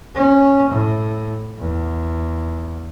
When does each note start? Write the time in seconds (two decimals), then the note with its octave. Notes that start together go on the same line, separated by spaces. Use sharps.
0.15 C#4
0.70 A2
1.59 E2